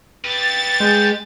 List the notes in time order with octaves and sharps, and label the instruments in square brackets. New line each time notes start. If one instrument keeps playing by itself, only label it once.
[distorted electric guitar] G4 B4 [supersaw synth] A6
[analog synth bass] G#3 [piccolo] G6